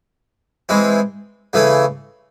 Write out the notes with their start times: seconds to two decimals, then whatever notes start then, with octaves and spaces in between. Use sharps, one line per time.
0.69 E3 G#3 C4
1.53 C#3 E3 A3 C#4